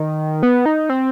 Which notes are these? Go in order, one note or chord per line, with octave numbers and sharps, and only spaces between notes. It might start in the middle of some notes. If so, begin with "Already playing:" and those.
Already playing: D#3
B3
D#4
C4